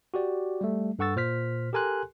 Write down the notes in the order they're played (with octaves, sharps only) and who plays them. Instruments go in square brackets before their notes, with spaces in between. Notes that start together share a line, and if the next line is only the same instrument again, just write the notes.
[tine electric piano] F#4 G4 D5
G3 A3
G2 A4 F#5 C#6 E6 A6
A#2 C5 F6 B6
G4 A4 A#4 G#5 C6 F#6